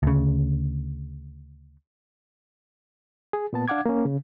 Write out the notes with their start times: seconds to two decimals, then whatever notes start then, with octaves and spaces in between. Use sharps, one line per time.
0.03 D2 C#3
3.33 G#4
3.53 A#2 B3 A5
3.68 D4 F5 F#5 D6 G#6
3.86 A#3 C#4
4.05 C#3